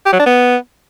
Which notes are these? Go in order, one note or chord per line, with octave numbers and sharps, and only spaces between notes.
G4
F#3
D4
B3